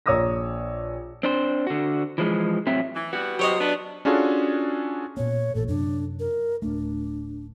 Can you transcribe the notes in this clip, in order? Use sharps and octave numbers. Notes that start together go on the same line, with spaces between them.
A#1 C#5 A#5 D#6 E6 A#6
C4 D4 C5
D3 F#4
E3 F3 G#3
A2 F#3 C4 E5
E3
E3 G3 B3 F#4
F#3 G4 C5 C#5 D#5
B3 D4 B4
C#4 D4 F4 F#4 G#4 A4
A#2 B3 C#5
A1 A#2 A4
F#2 C3 D4
A#4
D1 A3 D4